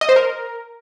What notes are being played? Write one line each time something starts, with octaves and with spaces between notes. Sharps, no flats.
D#5
C5
A#4